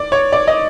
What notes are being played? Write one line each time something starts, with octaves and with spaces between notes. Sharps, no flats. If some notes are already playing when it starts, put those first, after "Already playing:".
Already playing: D5
C#5
D5
D#5